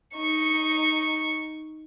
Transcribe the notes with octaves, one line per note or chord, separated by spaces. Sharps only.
D#4 C#6